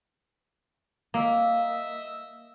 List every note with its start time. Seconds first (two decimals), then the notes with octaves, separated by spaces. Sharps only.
1.14 A#3 D#5 E5